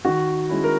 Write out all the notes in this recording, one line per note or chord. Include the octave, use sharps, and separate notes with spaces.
D#3 F#4
G#3 C#4 E4
A#4